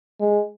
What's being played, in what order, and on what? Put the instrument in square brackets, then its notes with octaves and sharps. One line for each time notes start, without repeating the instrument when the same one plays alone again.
[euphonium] G#3